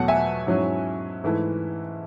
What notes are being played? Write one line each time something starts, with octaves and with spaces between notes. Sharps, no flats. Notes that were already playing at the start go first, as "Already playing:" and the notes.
Already playing: E2 B2 F#3 A3 F#5 A5
E5 G#5
G#2 F#3 C#4 E4
G#2 E3 A3 E4